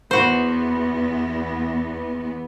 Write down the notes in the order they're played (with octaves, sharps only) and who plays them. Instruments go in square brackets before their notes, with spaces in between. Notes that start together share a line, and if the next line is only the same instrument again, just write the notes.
[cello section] E2 B3 [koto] F#4 C5